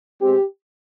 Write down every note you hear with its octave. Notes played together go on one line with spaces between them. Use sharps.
B2 G#3 C4 G4